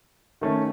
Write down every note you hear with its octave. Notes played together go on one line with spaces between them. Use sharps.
D#3 A3 C#4